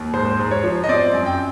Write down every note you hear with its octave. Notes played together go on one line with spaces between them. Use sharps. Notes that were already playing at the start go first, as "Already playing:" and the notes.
Already playing: D#2
G#2 C5
G#2
C#5
F3
D#5
C4 D5
F#2
G5